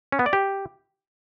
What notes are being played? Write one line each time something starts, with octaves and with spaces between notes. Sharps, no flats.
C#4
B3
D5
G4